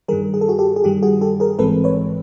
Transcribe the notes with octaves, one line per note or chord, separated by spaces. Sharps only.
G2 D#3 G3 G#4 A#4
G#4
A4
F#4 G#4
G4 A4
G#4
G2 D#3 G3 G4
F#4 G#4
G4 A4
G#4 A#4
A1 G#2 E3 G#3 C4 A4 B4
B4 C#5